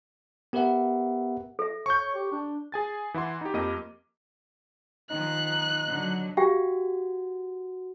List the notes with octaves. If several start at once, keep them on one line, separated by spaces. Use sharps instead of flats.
B3 G4 A#4 B4 E5 F#5
A4 E5
C#5 C#6 G6
G4
D4
G#4 G#5 A6
E3 E4 F#5 C6
D#4 G4
F2 A#3 G4 D#5 D6 D#7
D#3 F3 D#4 F#6
D3 F#3
F#4 G4 F5 G5